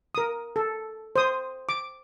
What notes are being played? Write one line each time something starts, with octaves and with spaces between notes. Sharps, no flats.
A#4 D#6
A4
C5 D#6
D6